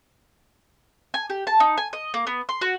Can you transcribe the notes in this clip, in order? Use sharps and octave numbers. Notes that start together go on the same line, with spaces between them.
G#5
G4
A5
D#4
G#5
D#5
A#3
B3
C6
F#4